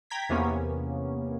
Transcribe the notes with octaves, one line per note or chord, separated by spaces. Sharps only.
G5 A#5 G#6 B6
E2 C3 A#3 B3 C#4